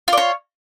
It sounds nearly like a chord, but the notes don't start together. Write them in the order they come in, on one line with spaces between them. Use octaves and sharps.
F4 D5 C#5